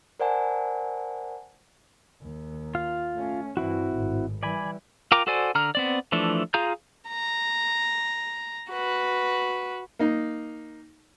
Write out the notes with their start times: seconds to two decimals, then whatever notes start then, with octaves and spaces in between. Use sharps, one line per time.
0.20 A#4 C5 D5 F#5 G#5 A5
2.21 D#2
2.75 F4 F5
3.14 A3 C#4
3.57 G2 E3 C4 E4 F#4
3.94 G#1 A2
4.43 E3 G3 D5 G#5 B5
5.12 F4 A#4 G5 A#5 D6
5.27 F#4 A4 C5 D5 G#5
5.55 D3 A#5 F6
5.75 B3 C4 D5
6.12 E3 F3 A3 D4
6.54 F4 G#4 F5 A#5 G6
7.09 A#5
8.69 F#4 B4
9.99 A#3 D#4